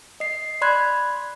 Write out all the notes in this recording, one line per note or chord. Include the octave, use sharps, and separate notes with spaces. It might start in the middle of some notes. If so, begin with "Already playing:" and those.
D#5 C7
D5 B5 C6 F#6 G#6